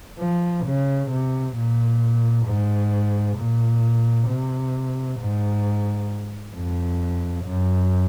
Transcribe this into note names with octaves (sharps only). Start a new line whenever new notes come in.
F3
C#3
C3
A#2
G#2
A#2
C3
G#2
F2
F#2